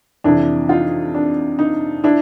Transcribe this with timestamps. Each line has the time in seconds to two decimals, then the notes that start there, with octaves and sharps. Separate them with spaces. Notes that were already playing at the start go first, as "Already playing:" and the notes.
0.24 F2 C3 E3 D4 E4
0.69 D#4 F4
1.15 D4
1.59 D#4
2.04 D4 E4